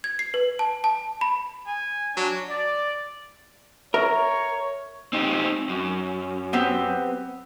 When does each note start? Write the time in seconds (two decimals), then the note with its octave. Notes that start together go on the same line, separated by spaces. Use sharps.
0.04 G#6
0.19 C7
0.34 B4
0.59 A5
0.84 A5
1.21 B5
1.67 G#5
2.17 F#3 D4
2.49 D5
3.94 A#4 C#5 E5
5.13 C4 D#4 G4
5.69 F#2
6.53 B3 C4 G4